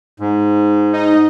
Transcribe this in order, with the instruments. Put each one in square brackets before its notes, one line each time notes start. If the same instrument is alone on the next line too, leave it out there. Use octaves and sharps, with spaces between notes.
[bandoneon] G#2
[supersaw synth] D#4 D#5